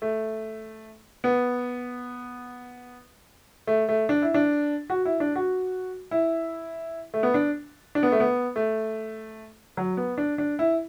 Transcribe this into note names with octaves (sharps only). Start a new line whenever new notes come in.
A3
B3
A3
A3
D4
E4
D4
F#4
E4
D4
F#4
E4
A3
B3
D4
D4
B3
A3
B3
A3
F#3
B3
D4
D4
E4